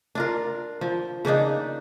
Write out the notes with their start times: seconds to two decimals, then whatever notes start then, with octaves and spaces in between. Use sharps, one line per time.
0.15 D4 F4 A#4
0.81 F3
1.25 C#3 A#3 D4 D#4